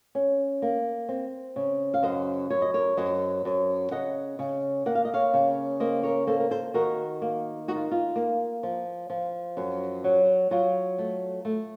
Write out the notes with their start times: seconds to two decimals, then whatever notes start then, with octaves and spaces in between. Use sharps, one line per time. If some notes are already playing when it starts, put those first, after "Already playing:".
0.15 C#4
0.62 A#3
1.09 C4
1.56 C#3
1.94 F5
2.03 F#2 C5 D#5
2.50 F#2 C#5
2.62 D#5
2.74 A#4 C#5
2.97 F#2 C5 D#5
3.45 F#2
3.91 C#3 D#5 F#5
4.39 C#3
4.86 A#3 F#5
4.95 F5
5.05 D#5
5.14 C#5 F5
5.34 C#3
5.80 A#3 C5 D#5
6.03 A#4 C#5
6.27 A#3 A4 C5
6.40 A#4
6.51 A4 C5
6.74 D#3 F#4 A#4
7.22 A#3
7.68 D#4 F#4
7.76 F4
7.91 F4
8.16 A#3
8.63 F3
9.10 F3
9.57 F#2
10.04 F#3
10.51 F#3 F4
10.98 A3
11.45 A3